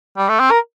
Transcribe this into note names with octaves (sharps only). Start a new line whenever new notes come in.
G3
A3
C4
A#4